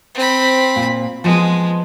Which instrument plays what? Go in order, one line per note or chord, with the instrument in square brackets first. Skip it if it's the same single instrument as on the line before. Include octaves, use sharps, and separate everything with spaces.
[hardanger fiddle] C4 B5
[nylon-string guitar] A#2
[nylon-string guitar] F3 B3 [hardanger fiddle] G#3